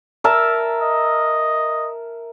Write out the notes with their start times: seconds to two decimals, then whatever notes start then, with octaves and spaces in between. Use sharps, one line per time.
0.24 A#4 E5 A5
0.82 D#5